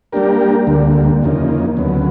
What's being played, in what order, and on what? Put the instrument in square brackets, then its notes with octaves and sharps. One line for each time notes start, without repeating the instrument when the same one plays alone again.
[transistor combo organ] G3 A#3 D4 G4 A#4
D2 D3 G3 A#3
E2 C#3 F3 A#3 D#4
D2 C#3 F#3 B3